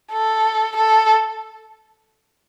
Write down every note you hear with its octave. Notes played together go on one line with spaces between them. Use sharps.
A4
A4